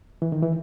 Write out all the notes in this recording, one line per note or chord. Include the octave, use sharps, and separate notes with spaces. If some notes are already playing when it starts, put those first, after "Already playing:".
E3
D#3
E3